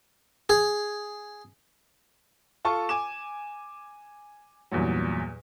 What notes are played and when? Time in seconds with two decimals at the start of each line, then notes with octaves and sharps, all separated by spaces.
0.49 G#4
2.65 F4 A4 A5 C#6
2.89 G#5 D6 E7
4.71 E2 G2 A#2 F#3